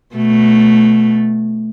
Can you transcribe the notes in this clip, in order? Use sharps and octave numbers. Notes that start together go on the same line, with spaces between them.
B2 A3